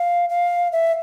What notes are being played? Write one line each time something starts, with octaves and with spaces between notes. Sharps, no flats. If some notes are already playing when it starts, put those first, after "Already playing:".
Already playing: F5
F5
E5